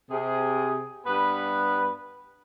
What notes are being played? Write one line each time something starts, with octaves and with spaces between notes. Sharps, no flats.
C3 G#4
G2 G3 B3 B4